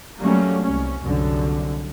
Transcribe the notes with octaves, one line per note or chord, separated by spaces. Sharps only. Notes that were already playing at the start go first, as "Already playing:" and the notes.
F#3 G3 A3 A#3 C#4
C2 C#4
C2 F#2 D3